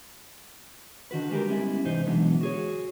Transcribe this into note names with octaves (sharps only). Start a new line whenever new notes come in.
D3 D#3 F#4 B4
G3 G#3 G4 A#4
G3 G#3 B3 C#4 E4
E2 G#2 C3 D#4 C5
B2 D3 E3 F#3 G#3 B3
F#4 G#4 C#5